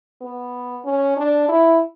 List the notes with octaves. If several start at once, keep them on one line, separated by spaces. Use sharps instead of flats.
B3
C#4
D4
E4